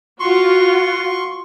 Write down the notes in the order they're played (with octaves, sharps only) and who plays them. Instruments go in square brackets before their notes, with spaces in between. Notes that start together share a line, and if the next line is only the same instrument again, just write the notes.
[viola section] F4 F#4 [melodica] C6 C#6